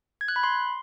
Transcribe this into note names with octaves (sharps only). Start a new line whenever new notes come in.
G#6
F#6
B5
C6